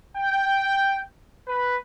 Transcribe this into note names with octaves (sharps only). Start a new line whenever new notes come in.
G5
B4